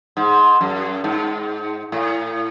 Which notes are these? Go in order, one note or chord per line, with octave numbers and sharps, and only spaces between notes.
G#2
F#2
G#2
A2